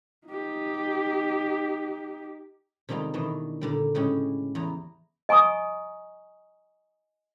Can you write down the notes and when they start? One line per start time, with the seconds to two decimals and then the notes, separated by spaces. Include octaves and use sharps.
0.27 D#4 G4
2.89 C3 D#3 G3 G#3 F4
3.14 B2 D#3 E3 D4
3.61 A#2 D3 G3
3.95 A2 C#3 G#3 C#4 G4
4.55 E2 A#5
5.29 D#5 G#5 A#5 C#6 D#6